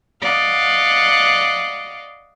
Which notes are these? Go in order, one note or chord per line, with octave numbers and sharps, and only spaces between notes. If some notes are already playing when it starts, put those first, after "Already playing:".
D5 D#5 F5 F#5